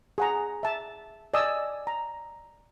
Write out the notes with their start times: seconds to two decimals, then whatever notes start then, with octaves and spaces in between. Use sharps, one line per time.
0.18 G#4 F#5 A#5
0.63 E5 A5
1.34 D5 D#5 G#5 A5 D#6 E6
1.87 A#5